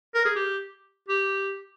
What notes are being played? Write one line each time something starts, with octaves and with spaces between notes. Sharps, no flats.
A#4
G#4
G4
G4